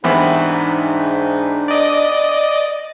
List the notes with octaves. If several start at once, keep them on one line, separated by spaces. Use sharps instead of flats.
C2 G#2 E3 B3 D4 D#4
D5 D#5